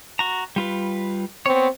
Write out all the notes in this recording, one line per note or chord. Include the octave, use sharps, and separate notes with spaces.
F#4 A#5
G3 F4 B4
B3 C4 C#5